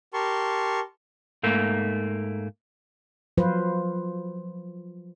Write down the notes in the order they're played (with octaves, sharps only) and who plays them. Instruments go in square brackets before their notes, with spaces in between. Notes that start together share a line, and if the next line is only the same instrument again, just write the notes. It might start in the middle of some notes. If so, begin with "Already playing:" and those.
[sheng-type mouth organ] G4 A#4 A5 C6 C#6
[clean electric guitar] G#2 A3 A#3
[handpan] F3 F#3 F4 B4 C5